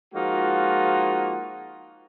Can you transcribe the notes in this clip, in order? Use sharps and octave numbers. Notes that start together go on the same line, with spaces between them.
F3 G#3 A#3 D#4 F4 F#4